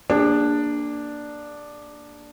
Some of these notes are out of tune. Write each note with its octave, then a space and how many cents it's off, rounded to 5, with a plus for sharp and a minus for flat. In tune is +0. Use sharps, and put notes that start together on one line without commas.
A#3 +0 D4 +0 G#4 -40